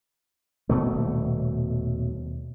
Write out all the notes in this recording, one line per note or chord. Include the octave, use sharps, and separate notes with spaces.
D#1 B2 A3